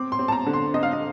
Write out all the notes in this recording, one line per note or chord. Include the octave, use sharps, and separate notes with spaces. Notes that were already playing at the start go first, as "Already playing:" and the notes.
Already playing: C4 D6
C6
C4
A5
A#5
D3
C6
C4 D#5
F5
D#5